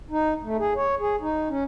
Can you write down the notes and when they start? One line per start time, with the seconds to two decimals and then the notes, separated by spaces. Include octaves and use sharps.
0.10 D#4
0.43 A3
0.59 G#4
0.75 C#5
1.00 G#4
1.21 D#4
1.49 C#4